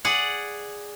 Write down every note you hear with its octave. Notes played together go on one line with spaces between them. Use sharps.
G#4 D5 F#5